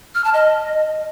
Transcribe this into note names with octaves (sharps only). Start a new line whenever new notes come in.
F6
A5
D#5